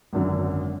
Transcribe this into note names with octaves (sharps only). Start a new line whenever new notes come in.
G#1 F#2 D3